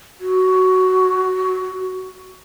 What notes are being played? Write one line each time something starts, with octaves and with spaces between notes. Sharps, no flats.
F#4